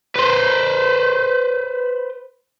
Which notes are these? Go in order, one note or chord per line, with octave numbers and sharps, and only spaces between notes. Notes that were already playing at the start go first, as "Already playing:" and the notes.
B4 C5